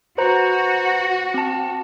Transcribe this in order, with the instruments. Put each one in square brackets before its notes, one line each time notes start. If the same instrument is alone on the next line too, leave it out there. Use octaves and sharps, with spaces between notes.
[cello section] F#4 [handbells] B4 C5 A#5
[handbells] C4 A5